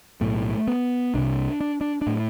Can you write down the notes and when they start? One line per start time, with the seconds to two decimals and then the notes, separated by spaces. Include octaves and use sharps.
0.21 B1 A2 A3
0.68 B3
1.14 C2 C3 D4
1.61 D4
1.81 D4
2.01 D4
2.07 A2